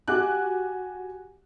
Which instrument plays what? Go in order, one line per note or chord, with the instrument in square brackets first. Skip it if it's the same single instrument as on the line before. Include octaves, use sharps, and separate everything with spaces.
[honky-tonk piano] F#4 G4 G#5 D6 F#6